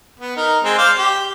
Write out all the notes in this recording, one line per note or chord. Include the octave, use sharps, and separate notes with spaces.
B3
D#4 A#4
G#3 C4
C5 D5 F5
G4